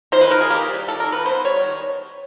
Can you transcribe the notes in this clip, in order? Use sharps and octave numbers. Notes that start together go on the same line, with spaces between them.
D#3 C5
B4
D#3 A#4
G#4
A#3 G4
G3
D#3 A4
A#4
D#3
B4
B3 C5
G3 C#5
D#3